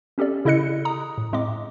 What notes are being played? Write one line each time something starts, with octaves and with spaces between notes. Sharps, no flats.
C4 C#4 G4 A4 D5
C#3 E4 A4 D#5 F#6 C#7
A#5 D#6
A2
A2 G#3 C4 D#5 D6